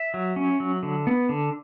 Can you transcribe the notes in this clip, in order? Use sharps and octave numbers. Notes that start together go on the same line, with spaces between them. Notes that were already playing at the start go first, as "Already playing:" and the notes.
Already playing: E5
F#3
C#4
F#3
D3
B3
D3